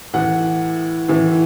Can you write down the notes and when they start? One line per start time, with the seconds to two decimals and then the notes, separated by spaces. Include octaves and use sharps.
0.13 A2 E3 F#5
1.08 A2 E3